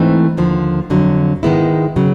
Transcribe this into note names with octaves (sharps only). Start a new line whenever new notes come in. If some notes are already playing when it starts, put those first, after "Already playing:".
Already playing: G#2 E3 A3 C4 D#4
D#2 D3 F3
F2 D3 F#3
G#2 D#3 G#3 B3 E4
C#3 F#3